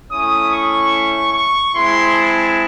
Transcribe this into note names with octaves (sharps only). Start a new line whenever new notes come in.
A3 C#4 E4 D#6
C#6
C#6
G#3 C4 E4 C6
A5